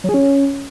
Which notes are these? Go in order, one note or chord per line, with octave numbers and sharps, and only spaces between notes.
F#3
G#4
C#4